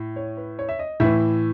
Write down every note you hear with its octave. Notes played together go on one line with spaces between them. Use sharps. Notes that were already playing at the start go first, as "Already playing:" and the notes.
Already playing: A2
C#5
B4
C#5
E5
D#5
A2 E3 E5